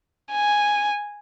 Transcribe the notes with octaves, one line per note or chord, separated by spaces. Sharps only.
G#5